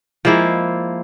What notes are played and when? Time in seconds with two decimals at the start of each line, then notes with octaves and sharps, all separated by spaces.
0.25 F3 G#3 A#3 E4